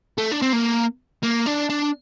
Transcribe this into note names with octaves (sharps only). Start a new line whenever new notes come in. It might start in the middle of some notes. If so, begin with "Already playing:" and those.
A3
D4
C4
A#3
A#3
D4
D4